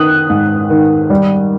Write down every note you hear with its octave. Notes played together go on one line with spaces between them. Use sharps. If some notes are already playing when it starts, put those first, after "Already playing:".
Already playing: D#3 D#6 F#6
G#2
D#3
G3